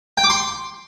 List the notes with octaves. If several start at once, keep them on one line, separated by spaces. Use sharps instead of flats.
G5
D6
C6